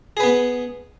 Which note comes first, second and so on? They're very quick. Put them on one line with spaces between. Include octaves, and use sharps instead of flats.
G#4 B4 B3